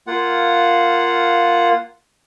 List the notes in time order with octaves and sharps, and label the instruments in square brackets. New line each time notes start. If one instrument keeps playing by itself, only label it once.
[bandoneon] A#3 F4 F#5